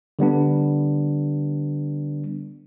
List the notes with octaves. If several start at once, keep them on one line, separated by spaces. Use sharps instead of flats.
D3 G3 B3 D4